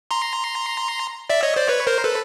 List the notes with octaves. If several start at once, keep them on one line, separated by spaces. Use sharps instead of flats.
A#5 C6
D5 E5
C#5 D#5
C5 D5
B4 C#5
A#4 C5
A4 B4